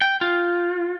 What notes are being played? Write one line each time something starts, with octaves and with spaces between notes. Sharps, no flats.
G5
F4